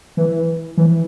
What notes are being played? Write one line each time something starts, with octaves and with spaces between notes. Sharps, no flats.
E3
E3